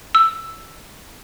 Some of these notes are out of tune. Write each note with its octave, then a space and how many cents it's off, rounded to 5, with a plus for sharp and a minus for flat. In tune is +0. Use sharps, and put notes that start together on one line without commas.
E6 +5